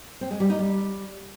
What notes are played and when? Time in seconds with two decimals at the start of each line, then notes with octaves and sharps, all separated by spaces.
0.21 C4
0.31 G#3
0.40 G3
0.50 D#4
0.59 G3